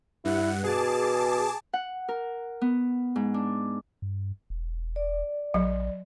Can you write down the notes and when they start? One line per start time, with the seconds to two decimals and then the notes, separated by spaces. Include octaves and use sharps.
0.25 G2 E4 F#5
0.64 B2 G#4 A5 D6
1.73 F#5
2.09 A#4
2.61 B3
3.16 G#2
3.34 D4
4.02 G2
4.50 E1
4.96 D5
5.54 A#1 F#3